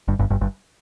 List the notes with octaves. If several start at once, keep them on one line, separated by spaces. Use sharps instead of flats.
G1 G2
G1 G2
G1 G2
G1 G2